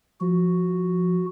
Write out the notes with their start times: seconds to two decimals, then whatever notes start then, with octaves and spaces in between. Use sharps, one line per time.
0.21 F3 F#4